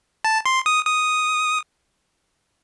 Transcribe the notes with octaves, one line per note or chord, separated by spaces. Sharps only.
A5
C6
D#6
D#6